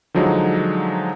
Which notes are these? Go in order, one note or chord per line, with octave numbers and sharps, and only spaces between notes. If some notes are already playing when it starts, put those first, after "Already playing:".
D3 F3 F#3 G#3 D#4